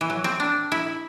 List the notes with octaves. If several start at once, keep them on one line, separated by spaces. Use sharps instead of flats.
E3
F#3
C4
D4
E4